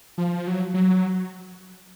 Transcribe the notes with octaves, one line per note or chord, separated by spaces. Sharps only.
F3
F#3
F#3